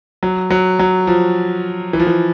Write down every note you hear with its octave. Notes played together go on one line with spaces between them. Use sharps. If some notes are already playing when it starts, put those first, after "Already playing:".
F#3
F#3
F#3
F3
E3
F3
E3